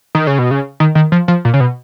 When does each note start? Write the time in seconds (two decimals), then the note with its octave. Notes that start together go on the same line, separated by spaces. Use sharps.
0.15 D#3
0.27 C#3
0.39 B2
0.51 C#3
0.80 D#3
0.95 D#3
1.12 F3
1.28 F3
1.45 A#2
1.54 C#3
1.60 B2